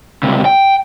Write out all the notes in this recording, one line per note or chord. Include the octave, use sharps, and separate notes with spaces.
C#2 C3
G5